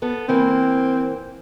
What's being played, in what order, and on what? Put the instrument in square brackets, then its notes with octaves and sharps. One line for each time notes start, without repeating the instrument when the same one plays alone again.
[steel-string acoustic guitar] B3 A4
[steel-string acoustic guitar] E3 A#3 [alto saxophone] C4